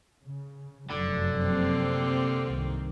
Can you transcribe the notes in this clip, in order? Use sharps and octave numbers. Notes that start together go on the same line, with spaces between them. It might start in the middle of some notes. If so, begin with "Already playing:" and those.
C#3
F1 F#2 D3 F#3
C3 A#3 C4
C2 G2 D#3